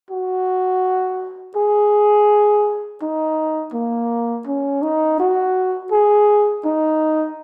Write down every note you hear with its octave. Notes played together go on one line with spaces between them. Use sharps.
F#4
G#4
D#4
A#3
C#4
D#4
F#4
G#4
D#4